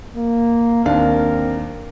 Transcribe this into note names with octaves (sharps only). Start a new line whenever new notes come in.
A#3
D#2 C4 D4 A#4 F5